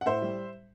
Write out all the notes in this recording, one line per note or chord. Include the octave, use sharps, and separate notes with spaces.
F#5
A2 C5 E5
G3